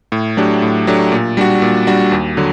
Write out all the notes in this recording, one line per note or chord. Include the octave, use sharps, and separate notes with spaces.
A2
F#3 A3 D4 G4
A2
F#3 A3 D4 G4
A#2
G3 D4 F#4
A#2
G3 D4 F#4
D#2
D3 F#3